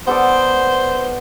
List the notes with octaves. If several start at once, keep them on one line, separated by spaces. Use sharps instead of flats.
B3 A4 C5 D5